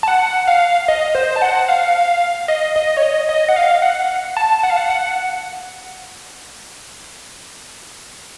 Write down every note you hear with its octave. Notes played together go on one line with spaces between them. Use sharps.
A5
F#5
F5
D#5
C5
A5
F#5
F5
D#5
D#5
C#5
D#5
D#5
F#5
F5
F#5
A5
F#5
F5
F#5
F#5